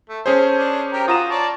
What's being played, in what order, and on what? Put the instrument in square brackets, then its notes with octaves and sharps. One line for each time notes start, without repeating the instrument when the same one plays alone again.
[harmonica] A3
[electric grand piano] C#4 G#4 C5 [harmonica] A4
[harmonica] D4
G4 A#4
[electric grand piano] F4 A#5 E7 [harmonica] F#4 D#6
[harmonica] C#5 D5 A5